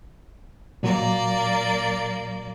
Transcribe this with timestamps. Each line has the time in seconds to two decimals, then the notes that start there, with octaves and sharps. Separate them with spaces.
0.83 A#2 F#3 A#3 D5